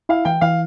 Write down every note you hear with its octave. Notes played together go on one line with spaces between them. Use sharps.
E4 F5
E3 G5
E3 F5